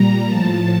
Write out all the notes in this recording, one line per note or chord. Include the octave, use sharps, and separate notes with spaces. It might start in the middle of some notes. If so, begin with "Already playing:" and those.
Already playing: A#2 G3 A#5
A2 F3 A5